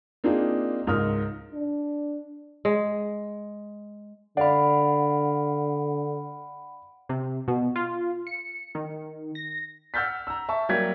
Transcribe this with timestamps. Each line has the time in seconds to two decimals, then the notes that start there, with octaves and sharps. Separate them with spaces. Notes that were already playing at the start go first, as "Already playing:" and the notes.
0.24 A#3 C4 D4 D#4 F4 G#4
0.87 C#2 G#2 A#4 D#6 F6
1.54 D4
2.65 G#3
4.37 D3 D5 F5 F#5 B5
7.09 C3
7.48 B2
7.76 F4
8.27 C#7
8.75 D#3
9.35 A#6
9.94 F#5 E6 F6 G6 A6 B6
10.27 A#5 E6
10.49 E5 A5 C#6
10.69 F#3 G3 A#3 G4 G#6 B6